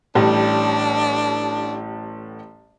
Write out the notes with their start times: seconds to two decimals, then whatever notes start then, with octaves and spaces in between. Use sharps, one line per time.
0.15 A1 G3 D4